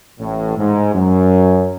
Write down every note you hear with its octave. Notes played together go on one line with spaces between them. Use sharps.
A1 A2
G#2
F#2